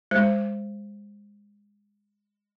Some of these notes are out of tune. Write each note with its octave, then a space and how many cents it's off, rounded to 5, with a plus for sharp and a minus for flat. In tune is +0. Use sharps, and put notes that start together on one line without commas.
G#3 -25 C5 +5